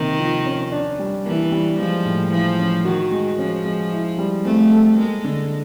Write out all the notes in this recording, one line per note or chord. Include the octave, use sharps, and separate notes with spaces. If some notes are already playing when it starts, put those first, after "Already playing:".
Already playing: C3 D#3 A#3
F3
C#4
D4
G3
E3 A#3
G3
F3 G#3
A2
E3 F3
C#4
D#3 F#4
G#3
F3 C#4
G#3
E4
G3
A3 C4
A4
G#3 A#3
D3